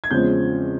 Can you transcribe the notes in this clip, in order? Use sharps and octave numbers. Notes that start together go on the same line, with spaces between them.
G#6
E2 C#3 F3 G#3 C4 G6